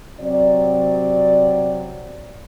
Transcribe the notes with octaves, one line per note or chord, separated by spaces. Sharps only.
C3 F#3 C4 D5